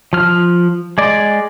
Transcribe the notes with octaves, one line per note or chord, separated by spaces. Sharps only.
F3 F6
G#3 D5